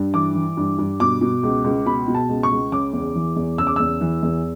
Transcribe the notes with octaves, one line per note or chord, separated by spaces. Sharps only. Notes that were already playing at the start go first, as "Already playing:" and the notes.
Already playing: G2
E3 D6
E3
G2
G2
B2 D6
B2
C#2
C#2
B2 B5
B2
A5
C#2
C#6
C#2
C#3 D6
E2
E3
E2
C#3 E6
D6
E2 E6
E3
E2